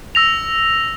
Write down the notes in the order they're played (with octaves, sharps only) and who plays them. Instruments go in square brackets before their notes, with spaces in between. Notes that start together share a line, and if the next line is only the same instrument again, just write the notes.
[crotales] E6 A#6 F7